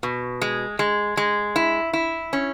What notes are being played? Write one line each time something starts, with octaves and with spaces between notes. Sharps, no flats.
B2
G#3
G#3
G#3
E4
E4
C#4